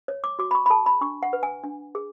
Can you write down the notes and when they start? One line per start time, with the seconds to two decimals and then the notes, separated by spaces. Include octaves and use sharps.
0.08 C#5
0.24 D6
0.39 F#4 D6
0.51 B5
0.55 C#6
0.66 B5
0.70 A4 A5
0.86 B5
1.01 D4 C#6
1.23 F#5
1.33 B4
1.43 G#5
1.64 D4
1.95 G#4